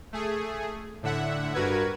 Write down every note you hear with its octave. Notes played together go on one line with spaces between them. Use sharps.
A3 G#4
A2 D3 E5 F#5
G2 F#4 A#4 B4 G#6